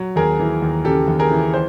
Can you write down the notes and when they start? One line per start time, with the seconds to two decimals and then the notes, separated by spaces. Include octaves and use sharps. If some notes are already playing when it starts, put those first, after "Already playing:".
Already playing: F#3
0.16 D#2 G#4 A#4
0.39 E3
0.62 D#2
0.85 C#3 G4 A4
1.08 D#2
1.19 G#4 A#4
1.31 E3
1.54 C5